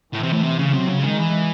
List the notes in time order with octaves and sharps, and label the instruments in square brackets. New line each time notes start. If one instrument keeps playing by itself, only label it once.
[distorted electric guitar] A2 [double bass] E3
[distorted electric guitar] C3
A2
C3
C#3
[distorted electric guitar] C3 [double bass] F#3
[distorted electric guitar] C#3
[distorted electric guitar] D#3 [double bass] G#3
[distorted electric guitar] E3